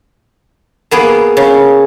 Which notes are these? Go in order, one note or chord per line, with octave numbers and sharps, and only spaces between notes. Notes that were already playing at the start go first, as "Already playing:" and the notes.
A#3 B3 G#4
C#3